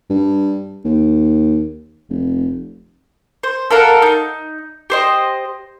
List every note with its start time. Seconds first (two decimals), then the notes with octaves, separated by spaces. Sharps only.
0.10 G2
0.85 D#2
2.10 F1
3.43 C5
3.70 A4 A#4 F5 F#5
4.02 D#4
4.90 G4 C5 D#5